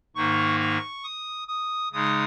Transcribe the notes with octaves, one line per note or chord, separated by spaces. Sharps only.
G#2 D#3 A#3 D#4 C#6
C#6
D#6
D#6
C#3 G#3 D#4 D#6